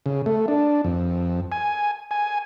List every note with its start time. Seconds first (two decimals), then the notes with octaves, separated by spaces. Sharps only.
0.06 C#3
0.26 A3
0.48 D4
0.84 F2
1.52 G#5
2.11 G#5